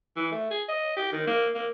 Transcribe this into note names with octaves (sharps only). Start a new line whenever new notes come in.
E3
A3
G#4
D#5
G4
D#3
A#3
A#3